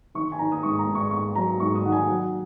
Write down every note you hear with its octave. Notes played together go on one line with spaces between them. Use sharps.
D#3 C#6
G#5
D#3 A#5
D#6
G#2 C#6
A#5
G#2
C#6
G#2 C#6
F#3 A#5
G#2 C#6
D#6
D#3 F#5
G#5
F#3 F#5